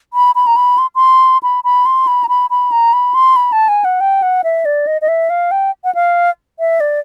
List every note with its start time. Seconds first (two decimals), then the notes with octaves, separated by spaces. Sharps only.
0.13 B5
0.35 B5
0.47 A#5
0.56 B5
0.78 C6
0.95 C6
1.43 B5
1.64 B5
1.86 C6
2.07 B5
2.24 A#5
2.29 B5
2.50 B5
2.72 A#5
2.93 B5
3.14 C6
3.36 B5
3.52 A5
3.68 G#5
3.84 F#5
4.00 G5
4.22 F#5
4.44 E5
4.65 D5
4.87 D#5
5.01 D#5
5.08 E5
5.30 F5
5.51 G5
5.84 F#5
5.95 F5
6.59 E5
6.80 D5